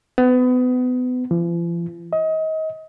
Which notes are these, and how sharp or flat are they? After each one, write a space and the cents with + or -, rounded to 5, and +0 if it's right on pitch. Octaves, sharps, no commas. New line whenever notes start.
B3 +30
F3 -45
D#5 +30